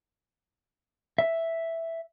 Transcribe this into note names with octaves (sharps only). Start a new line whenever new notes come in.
E5